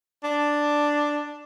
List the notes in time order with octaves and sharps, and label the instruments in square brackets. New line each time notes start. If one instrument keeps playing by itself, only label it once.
[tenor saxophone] D4